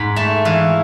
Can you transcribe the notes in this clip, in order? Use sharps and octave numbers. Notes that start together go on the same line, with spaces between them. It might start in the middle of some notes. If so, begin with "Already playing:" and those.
Already playing: G#2 B5
A3 A5
E3 F5